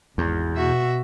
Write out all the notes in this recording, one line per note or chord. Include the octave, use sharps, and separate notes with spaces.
G#1 E2
B2 F#4 E5